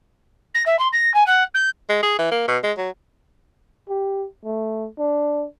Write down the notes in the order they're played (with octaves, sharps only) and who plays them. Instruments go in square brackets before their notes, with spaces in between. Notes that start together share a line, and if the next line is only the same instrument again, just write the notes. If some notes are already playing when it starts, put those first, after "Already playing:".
[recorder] A#6
E5
C6
A#6
G#5
F#5
G6
[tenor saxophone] G#3
G#4
E3
A#3
B2
G#3
F#3
[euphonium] G4
A3
D4